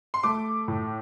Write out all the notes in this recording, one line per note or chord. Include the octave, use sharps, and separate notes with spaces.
C6
A3 D6
A2